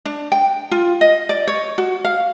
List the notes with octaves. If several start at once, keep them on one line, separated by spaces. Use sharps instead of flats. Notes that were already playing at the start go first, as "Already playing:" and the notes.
D4
G5
F4
D#5
D5
C#5
F#4
F5